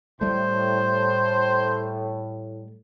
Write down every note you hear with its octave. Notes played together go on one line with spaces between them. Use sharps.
A2 G3 A3 C5